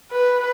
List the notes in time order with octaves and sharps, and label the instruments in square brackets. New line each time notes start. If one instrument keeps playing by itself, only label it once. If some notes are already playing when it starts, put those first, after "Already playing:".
[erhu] B4